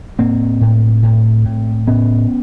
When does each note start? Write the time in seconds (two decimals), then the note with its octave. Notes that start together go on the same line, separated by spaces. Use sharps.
0.19 A2 A#3 C4
0.61 A2
1.03 A2
1.45 A2
1.87 A2 B3 C#4